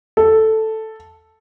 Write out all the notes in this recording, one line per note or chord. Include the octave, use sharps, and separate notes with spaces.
A4